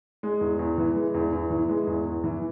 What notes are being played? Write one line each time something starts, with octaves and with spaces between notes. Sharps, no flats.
G#3
E2
E2
E3
G#3
E2
E2
E3
G#3
E2
E2
E3